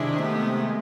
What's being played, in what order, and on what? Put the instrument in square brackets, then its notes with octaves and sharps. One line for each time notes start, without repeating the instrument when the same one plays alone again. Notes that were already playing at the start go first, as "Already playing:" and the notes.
Already playing: [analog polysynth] C3 D#3 G#3 [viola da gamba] D4 E4
[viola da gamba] A3 B3